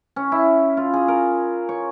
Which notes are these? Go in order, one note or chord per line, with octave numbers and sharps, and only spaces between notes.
C#4
E4
F4
G#4
A#4
C#5